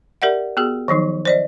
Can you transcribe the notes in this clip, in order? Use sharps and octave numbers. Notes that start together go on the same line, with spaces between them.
G4 A#4 D5 E5 F#5
B3 F#4 G#4
D#3 F3 F#3 D#4
C5 D5 D#5